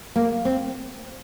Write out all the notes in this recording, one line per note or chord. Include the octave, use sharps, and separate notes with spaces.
A#3
C4